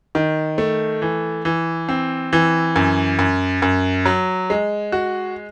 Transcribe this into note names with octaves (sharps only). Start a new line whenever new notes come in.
D#3
A3
E3
E3
C4
E3
F#2
F#2
F#2
F#3
G#3
F#4